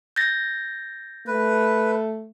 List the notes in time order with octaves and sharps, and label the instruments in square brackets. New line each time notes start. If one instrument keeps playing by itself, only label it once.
[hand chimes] G6 A6 A#6
[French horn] A3 [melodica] B4